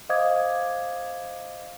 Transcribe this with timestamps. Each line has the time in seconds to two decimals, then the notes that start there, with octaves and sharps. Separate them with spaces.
0.09 C5 D#5 F5 D6 D#6 G#6